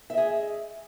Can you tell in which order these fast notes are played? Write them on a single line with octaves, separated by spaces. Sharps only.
E5 D#5 G#4